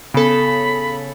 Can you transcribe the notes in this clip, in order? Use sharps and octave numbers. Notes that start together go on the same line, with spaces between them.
C#3 B3 A4 B5